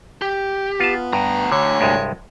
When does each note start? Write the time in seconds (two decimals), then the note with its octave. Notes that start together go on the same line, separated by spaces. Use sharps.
0.22 G4
0.80 B3 F4 A5
1.13 D2 G2 A#5
1.52 D3 C#5
1.81 C2 G2 G#3